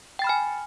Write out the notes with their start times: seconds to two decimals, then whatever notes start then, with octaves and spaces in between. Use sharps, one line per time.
0.19 G5
0.22 A6
0.24 B5
0.27 F6
0.29 G#5